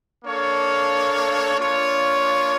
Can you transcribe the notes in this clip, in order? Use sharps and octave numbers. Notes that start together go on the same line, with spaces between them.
A#3 D4 A4 C#5 F5
A#3 D4 F4 C#5